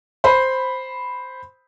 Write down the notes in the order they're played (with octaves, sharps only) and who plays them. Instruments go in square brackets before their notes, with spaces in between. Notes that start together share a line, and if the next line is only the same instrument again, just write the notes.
[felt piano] C5 B5